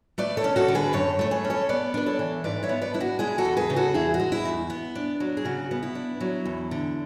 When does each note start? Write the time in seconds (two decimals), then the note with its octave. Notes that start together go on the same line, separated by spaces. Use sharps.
0.18 A3 B4 D5
0.37 A4 C#5
0.44 C#4
0.56 F#4 A4
0.68 D3
0.75 G#4 B4
0.93 F#2 A4 C#5
1.19 A3 C#5
1.31 G#4 B4
1.44 C#4
1.50 A4 C#5
1.69 B3 B4 D5
1.94 D4 B4
2.06 A4 C#5
2.19 E3
2.44 G#2 B4 D5
2.63 C#5 E5
2.69 B3
2.82 B4 D5
2.94 D4 E4
3.01 F#4
3.19 G#3 E4 G#4
3.38 F#4 A4
3.45 E2
3.57 G#4 B4
3.70 C#3
3.76 F#4 A4
3.94 E2 E4 G#4
4.14 F#4
4.20 G#3
4.32 E4
4.45 E2
4.70 B3
4.95 D4
5.20 F#3
5.37 G#4
5.45 C#3 F#4
5.71 B3
5.83 E4
5.95 D4
6.20 F#3
6.45 E2
6.71 D3